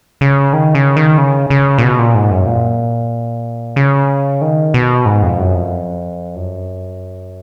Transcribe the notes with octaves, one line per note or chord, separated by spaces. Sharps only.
C#3
D#3
C#3
D#3
C#3
C#3
A#2
B2
A#2
G#2
F#2
A#2
C#3
D#3
B2
G#2
F2
F#2
F2
F#2